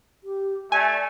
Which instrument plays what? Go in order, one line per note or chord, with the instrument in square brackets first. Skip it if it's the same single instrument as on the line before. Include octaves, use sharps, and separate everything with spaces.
[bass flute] G4
[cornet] A3 [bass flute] D5 [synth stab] G#5